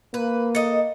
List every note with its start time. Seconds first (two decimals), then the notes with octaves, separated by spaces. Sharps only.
0.14 A#3 B4
0.55 A4 D#5